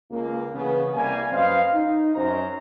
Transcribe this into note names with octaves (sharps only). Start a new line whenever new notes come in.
C#2 A#3
C#3 E3 B3
C2 G3 A#3 G#5
F#2 B4 C5 D#5 F5
D#4
F#2 C5 A#5